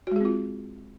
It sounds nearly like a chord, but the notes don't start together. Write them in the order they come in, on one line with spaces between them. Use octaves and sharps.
F#4 G#3 G#4 C4 F4